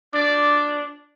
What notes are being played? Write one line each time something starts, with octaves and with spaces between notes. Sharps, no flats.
D4 D5